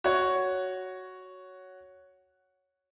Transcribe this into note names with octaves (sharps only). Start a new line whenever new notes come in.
F#4 C#5